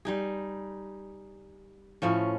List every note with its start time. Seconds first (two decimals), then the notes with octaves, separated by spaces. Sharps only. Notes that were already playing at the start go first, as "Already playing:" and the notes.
0.05 G3 D#4 G#4
2.02 A2 F3 C#4